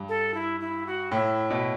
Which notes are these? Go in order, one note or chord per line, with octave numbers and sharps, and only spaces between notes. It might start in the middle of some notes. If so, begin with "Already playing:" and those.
Already playing: G2
A4
E4
E4
F#4
A2 E4
B2